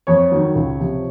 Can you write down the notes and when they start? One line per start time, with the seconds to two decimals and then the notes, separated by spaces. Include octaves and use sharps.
0.07 F2 C#5
0.32 D#3 F#3
0.55 C#2
0.79 C3 F3